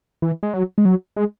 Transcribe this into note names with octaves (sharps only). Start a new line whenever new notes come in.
E3
G#3
F#3
G#3
F#3
G#3